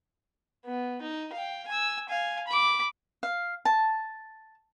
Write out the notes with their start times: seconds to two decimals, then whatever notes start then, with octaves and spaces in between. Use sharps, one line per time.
0.65 B3
1.02 D#4
1.33 F5 G5
1.68 G#5 E6
2.09 F5 G#5
2.48 B5 D6
3.23 F5
3.65 A5